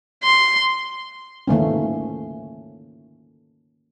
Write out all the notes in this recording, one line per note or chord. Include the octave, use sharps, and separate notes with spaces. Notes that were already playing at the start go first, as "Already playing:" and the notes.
C6
D#3 A3 A#3 C#4